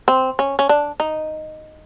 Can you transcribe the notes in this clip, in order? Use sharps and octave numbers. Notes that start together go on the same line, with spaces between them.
C4
C#4
C#4
D4
D#4